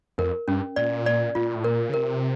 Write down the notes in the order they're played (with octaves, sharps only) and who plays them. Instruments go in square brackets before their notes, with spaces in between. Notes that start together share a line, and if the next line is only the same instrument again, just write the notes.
[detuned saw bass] F2 [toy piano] A#4
[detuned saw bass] G2 [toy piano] C#4
[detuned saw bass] A#2 [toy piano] D5
[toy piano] D5
[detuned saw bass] A#2 [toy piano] F4
[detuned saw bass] A2
[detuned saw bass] A#2 [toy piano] A#4
[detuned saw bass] C#3
[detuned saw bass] C3 [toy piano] A#4